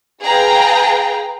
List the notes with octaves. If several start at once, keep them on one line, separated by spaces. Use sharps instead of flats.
G#4 B4 F5 G5 A#5